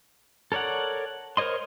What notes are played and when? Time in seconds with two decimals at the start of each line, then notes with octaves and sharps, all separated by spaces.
0.52 A4 A#4 C#5 D5 F#5
1.37 A#4 C5 C#5 D#5 C6